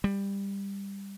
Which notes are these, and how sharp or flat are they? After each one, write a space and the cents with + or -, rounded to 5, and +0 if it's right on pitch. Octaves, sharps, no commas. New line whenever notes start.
G3 +15